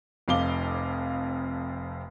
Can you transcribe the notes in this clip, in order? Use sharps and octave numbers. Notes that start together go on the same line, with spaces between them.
F1 F2 F5 D6 G7